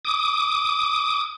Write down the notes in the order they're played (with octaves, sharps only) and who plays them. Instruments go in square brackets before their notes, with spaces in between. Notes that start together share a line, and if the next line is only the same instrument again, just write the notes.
[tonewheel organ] D6 D#6